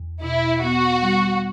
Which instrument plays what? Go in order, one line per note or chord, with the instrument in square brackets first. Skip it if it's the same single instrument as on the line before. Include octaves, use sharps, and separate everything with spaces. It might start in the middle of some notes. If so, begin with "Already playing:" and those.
Already playing: [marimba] E2
[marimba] B2 [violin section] E4
[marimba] B3 [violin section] F#4
[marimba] G3